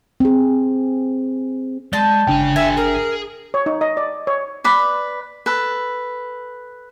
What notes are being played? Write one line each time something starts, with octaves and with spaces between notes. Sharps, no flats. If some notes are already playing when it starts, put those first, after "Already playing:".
C4 G#4
G#3 D5 A5 G6
G1 C#3 D4 G5 G#5
G#4 A#4 E5 G#5
G#4 A#4
C#5
D#4
D#5
D5
C#5
B4 D5 B5
A4 B4